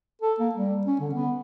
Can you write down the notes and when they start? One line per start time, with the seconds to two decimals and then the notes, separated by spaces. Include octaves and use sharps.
0.22 A4
0.40 A#3
0.55 G3
0.87 C#4
1.00 D3
1.14 B3